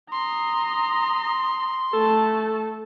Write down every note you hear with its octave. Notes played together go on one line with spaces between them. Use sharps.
A#5 C6 D#6
A3 A4 A5